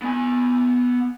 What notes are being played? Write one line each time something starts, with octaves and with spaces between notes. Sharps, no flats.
B3 G#5